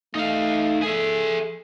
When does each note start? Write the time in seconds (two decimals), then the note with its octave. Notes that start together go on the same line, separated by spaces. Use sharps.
0.15 A3 D#4 F5
0.82 G#4 A4 E5